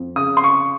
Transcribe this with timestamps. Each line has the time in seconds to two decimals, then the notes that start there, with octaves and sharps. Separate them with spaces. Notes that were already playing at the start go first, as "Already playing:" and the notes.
Already playing: F2
0.16 C#3 D#6
0.37 C6
0.44 C#6